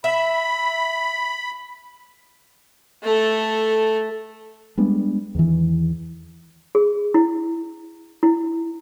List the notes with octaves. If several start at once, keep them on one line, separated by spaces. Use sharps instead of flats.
E5 B5
A3 A4
G3 G#3 B3 D4
E2 D#3 E3
G#4
E4
E4